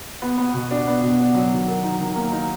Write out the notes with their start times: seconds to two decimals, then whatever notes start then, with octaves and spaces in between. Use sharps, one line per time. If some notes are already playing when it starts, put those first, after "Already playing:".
0.22 B3
0.37 B3
0.53 B2
0.71 D4
0.87 B3
1.02 B2
1.20 D4
1.35 F#3
1.52 D#3
1.68 A#4
1.83 D#4
1.99 D#3
2.16 A#3
2.32 D#4